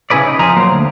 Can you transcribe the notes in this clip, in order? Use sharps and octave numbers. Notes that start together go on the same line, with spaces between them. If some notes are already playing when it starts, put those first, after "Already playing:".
C#3 C#4 E4 G#4 B4 D5
D#4
F2 F3 G#4 A#5
F#3 A#3 C5
D2